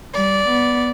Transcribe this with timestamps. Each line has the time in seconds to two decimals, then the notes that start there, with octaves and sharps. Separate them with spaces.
0.14 G3 D5
0.48 B3